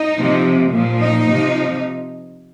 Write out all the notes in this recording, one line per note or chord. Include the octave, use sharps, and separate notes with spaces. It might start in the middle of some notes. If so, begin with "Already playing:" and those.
Already playing: D#4
C3 F3
A#2 F3
D#4
C3 F3